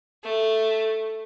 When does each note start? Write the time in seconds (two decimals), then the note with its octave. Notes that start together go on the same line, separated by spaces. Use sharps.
0.23 A3